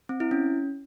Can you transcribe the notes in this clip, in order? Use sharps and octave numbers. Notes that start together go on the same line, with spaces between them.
C4
E4
C#4